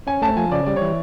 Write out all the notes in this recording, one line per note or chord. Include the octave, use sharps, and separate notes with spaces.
C#4 G#5
A3 A5
F3 G#5
C#3 D5
G3 D5
C#5
E3